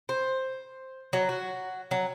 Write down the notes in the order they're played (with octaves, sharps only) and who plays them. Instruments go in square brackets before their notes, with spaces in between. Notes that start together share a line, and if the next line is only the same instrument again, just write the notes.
[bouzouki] C5
F#3
F#4
F#3